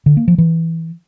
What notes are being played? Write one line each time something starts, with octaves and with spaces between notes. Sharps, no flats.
D3
A#3
F3
E3